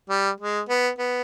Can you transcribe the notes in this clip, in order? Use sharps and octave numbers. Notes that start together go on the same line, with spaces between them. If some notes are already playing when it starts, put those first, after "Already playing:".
G3
G#3
B3
B3